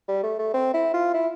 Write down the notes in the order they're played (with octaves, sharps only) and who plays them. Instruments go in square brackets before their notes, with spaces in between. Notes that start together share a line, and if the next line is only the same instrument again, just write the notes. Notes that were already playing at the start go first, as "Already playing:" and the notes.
[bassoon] G3
A3
A3
C4
E4
F4
E4